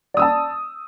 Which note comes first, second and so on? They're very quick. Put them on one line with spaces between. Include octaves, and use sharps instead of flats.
D5 D#6 E6 A5